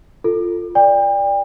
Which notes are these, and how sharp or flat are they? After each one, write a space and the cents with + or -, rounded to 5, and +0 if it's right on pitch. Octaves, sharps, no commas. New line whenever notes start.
F4 -5 A4 +15
D5 +0 G5 +35